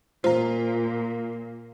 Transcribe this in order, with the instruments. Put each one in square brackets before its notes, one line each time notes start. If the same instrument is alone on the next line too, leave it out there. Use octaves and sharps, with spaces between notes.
[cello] A#2 [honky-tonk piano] F4 [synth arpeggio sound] C5 A#5